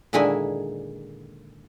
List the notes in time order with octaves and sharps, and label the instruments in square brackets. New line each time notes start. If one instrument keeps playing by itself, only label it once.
[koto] A#2 D3 D#3 G#3 E4 G#5